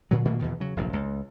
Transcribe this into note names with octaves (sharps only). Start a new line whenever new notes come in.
A#2 D3 F#3
A#2 D#3 A3 A#3
E2 B2 D#3
C#3 F#3
F1 A#1 G2
C#2